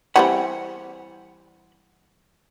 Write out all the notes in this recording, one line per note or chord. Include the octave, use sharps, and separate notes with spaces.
E3 G3 C4 F#5 B5